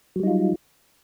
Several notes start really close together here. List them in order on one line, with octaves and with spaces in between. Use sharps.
F#3 G3 D#4 F4